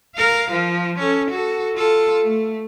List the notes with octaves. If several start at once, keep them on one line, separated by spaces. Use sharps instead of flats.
A#4 F5
F3
C#4 A4
F#4 A4
F4 A4
A3